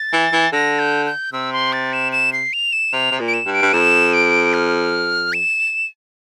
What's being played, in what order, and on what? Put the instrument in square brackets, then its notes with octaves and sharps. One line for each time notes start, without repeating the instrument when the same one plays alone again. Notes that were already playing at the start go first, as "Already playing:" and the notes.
Already playing: [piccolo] A6
[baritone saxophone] E3
E3
[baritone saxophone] D3 [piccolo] A#6
[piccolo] G6
G6
[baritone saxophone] C3 [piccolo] E6
[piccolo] C6
A6
E7
E7
C7
F7
E7
[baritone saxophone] C3 [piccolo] F7
[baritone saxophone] C3
A#2
[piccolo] D7
E7
[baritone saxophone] G2
[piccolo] D7
[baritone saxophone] G2
[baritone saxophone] F2 [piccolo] E7
[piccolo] D7
F6
E7